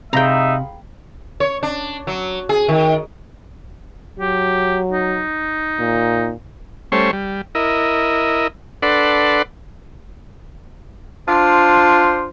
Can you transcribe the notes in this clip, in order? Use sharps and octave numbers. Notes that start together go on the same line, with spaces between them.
C3 D#4 G#4 E5 F5 G5 A#5 B5
C#5
D4
F#3
G#4
D#3
F#3 G4
D#4
A#2
G3 A3 C#4 C5 C#5
G3
E4 A#4 D#5
D4 A4 B4 D5 F#5 C6
D4 F4 C5